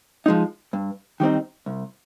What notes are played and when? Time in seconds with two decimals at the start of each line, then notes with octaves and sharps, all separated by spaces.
0.26 F3 G#3 D#4
0.73 G2
1.20 D#3 G3 C4 D#4
1.66 C2